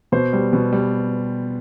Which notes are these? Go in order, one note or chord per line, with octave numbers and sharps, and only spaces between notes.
B2 C5
G3
B2
G3